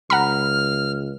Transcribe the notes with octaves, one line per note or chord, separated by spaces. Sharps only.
C#2 F#5 A#5 B5 F6